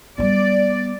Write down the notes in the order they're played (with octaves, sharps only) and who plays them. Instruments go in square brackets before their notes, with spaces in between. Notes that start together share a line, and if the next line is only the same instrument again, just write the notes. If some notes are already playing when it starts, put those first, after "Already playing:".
[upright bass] G3 B3 [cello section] D5